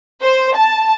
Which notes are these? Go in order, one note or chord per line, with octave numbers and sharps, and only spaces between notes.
C5
A5